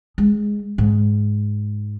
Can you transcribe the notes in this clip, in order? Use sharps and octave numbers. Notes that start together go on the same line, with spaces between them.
G#3
G#2